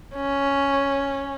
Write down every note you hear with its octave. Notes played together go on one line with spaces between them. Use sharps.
C#4